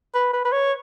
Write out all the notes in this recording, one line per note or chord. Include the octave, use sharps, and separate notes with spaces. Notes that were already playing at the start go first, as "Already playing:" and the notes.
B4
B4
B4
C#5